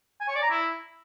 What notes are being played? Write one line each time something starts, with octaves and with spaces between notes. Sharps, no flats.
G#5
C#5
D5
A#5
E4